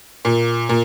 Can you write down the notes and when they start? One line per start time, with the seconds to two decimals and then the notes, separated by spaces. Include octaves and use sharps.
0.25 A#2
0.69 A#2